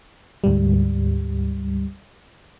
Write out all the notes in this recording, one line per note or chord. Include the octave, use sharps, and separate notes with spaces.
D2 G#2 G3